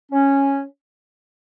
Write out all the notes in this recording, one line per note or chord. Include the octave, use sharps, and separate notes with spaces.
C#4